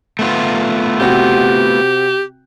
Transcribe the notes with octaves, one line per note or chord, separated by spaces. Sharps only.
A3 B3 F4
C3 C4 F#4 G4